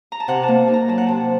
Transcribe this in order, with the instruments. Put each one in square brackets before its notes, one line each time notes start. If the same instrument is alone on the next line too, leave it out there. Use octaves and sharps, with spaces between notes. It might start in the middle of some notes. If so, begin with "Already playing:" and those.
[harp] A#5
A5
C3 F#5
A5
A#3
D#4
A#5
F#3 A5
F#5
C3 A5